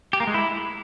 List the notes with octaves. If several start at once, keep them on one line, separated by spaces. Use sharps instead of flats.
G4
A#3
G#3
E4